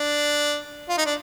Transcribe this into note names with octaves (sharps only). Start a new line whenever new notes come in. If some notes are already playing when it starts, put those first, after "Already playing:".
Already playing: D4
F4
D#4
D4